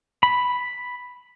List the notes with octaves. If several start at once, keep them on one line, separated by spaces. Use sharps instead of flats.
B5